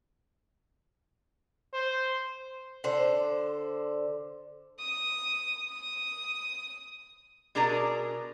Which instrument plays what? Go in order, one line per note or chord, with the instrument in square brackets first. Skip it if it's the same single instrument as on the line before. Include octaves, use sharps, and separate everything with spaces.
[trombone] C5
[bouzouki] D3 C5
[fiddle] D#6
D#6
[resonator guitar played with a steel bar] B2 D4 G#4 A#4 A#5